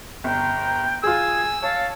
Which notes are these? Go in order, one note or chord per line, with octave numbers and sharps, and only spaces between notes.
G1 G5 A#5
F4 G#4 G#5 E6 G#6
C#5 F5 A5